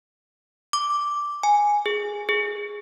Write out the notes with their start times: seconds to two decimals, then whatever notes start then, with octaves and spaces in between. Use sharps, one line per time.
0.73 D6
1.43 G#5
1.86 G#4
2.29 G#4